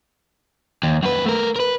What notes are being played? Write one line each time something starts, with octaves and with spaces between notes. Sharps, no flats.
D#2
F#2 B4
A3 A#4
A#4 B4